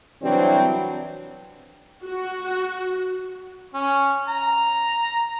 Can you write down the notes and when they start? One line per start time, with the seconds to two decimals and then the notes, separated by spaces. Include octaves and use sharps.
0.22 C3 E3 F#3 G3 C4 D4
2.03 F#4
3.74 C#4
4.28 A#5